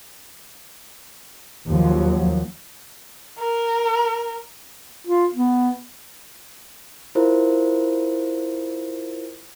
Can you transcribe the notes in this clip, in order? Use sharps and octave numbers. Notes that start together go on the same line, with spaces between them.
D#2 F3 F#3
A#4
F4
B3
E4 F4 A#4 C5